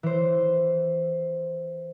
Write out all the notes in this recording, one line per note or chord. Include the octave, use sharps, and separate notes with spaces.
E3 C5